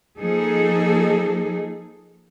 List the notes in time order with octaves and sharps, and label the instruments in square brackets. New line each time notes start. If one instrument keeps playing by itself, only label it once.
[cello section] F3 A#3 D#4 G#4 A4